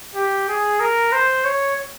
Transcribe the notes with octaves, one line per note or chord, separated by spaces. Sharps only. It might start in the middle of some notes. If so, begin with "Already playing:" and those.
G4
G#4
A#4
C5
C#5